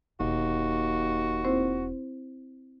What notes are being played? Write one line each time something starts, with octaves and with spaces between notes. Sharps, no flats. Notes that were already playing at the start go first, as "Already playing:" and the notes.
E1 D#2 F#4
C4 E4 C5